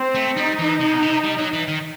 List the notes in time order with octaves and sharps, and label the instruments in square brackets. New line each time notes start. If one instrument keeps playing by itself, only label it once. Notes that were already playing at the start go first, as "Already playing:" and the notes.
Already playing: [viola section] C4
[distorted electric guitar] A3
[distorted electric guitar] G3 [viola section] D#4
[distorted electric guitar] E3
C3
B2
C3
G3
F#3
E3
D#3